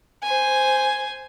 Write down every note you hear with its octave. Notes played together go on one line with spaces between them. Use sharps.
C5 G#5